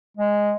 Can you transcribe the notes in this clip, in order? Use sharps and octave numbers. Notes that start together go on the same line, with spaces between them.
G#3